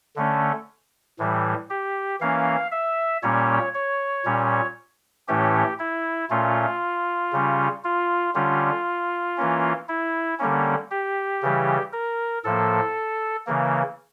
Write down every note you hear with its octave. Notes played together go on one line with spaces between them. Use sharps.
D3 A3 C#4
A2 E3 G3
G4
E3 A#3 C#4 F5
E5
A#2 G3 A#3 C#4 C#5
C#5
A#2 G3 C#4
A2 E3 A3 C#4 G4
E4
A#2 A3 C#4 F4
C#3 G3 C#4
F4
D3 G3 C#4 F4
E3 A#3 C#4
E4
D3 G3 A#3 C#4
G4
C#3 E3 G3
A#4
A2 F3 A#3 A4
C#3 E3 A#3